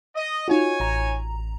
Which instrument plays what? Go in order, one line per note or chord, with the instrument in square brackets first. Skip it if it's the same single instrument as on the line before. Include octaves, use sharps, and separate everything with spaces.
[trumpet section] D#5
[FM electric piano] D#4 F4 F#4 [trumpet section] C#5 G#5
[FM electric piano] A1 A#5